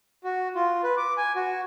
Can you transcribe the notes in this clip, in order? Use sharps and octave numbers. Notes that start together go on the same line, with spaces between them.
F#4
F4
B4
D6
G#5
F#4